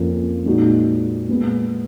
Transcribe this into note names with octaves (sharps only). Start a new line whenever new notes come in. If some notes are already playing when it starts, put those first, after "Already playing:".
Already playing: F2 F3 A#3 C#4 F4
A#2 G#3 D#4 F#4
A#2 G#3 B3